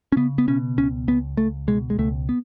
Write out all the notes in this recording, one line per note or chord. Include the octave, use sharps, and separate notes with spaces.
C#4
C#3 B3
B3
B2 C#4
C#2 C#4
C#2 B3
C#2 A3
B2 G#3
G#3
C#2 A3
B3